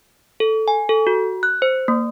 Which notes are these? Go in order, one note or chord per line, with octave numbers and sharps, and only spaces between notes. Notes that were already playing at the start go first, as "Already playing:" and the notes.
A4
G#5
A4
F#4
F#6
C5
A#3